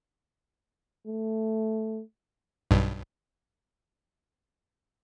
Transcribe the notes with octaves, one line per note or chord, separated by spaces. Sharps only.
A3
B1 G2